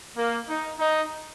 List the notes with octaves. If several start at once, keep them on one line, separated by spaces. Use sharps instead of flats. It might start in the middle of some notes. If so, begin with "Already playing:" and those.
A#3
D#4
D#4